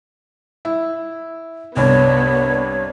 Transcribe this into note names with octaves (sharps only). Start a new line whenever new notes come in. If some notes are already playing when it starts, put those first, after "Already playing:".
E4
C2 G2 B3 C#5